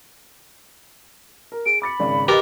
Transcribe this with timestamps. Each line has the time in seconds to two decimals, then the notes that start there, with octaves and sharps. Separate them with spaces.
1.52 A#4
1.66 G#4 D7
1.82 B5 D6 A6 C#7
2.00 G#1 C#3 D5
2.28 G4 A#4 B4 D#5 A6